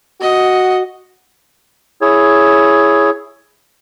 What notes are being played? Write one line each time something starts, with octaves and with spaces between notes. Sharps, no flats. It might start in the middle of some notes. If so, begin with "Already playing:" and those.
F#4 D#5
E4 G#4 C#5